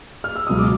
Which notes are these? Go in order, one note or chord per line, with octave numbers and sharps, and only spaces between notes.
F6
E6
C#2 B2 F#3 D#6
D6